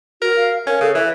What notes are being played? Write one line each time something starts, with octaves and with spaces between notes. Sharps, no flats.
F#4 A#4
F5
C#4 A#4
C#3 A4
E3 E5